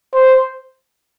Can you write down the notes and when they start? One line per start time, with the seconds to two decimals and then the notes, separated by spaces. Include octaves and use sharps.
0.13 C5